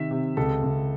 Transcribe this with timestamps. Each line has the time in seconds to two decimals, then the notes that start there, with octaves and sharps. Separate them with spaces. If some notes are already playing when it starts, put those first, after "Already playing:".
Already playing: C3 D#3 E5
0.11 C3
0.37 C#2 A4
0.64 C#2